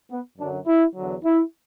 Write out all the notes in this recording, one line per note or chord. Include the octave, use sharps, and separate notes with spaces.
B3
F#2 D3 F#3 D4
E4
E2 D3 F#3
E4